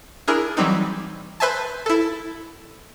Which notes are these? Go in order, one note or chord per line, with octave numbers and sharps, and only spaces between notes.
D4 E4 G#4 A#4
E3 F#3 G3 C4 D#4
B4 C5 E5 G#5 A5
E4 A4